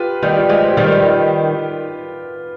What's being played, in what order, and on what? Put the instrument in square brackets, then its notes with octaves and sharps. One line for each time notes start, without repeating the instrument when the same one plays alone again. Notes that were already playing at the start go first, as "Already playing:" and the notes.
Already playing: [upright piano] F4 G4 B4
[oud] D#3 G3 [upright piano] F4
[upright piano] G4
F4
[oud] F3 G#3
[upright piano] G4
[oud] D#3 G3 [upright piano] F4